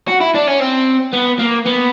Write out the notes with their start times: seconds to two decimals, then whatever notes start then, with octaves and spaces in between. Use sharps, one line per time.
0.08 F#4
0.21 E4
0.35 D4
0.47 C#4
0.60 C4
1.13 B3
1.39 A#3
1.66 B3